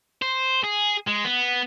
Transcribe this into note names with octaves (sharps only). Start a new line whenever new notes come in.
C5
G#4
G#3
B3